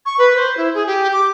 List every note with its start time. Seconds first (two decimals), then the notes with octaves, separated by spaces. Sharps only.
0.06 C#6
0.18 B4
0.36 C5
0.57 E4
0.74 G#4
0.87 G4
1.13 D6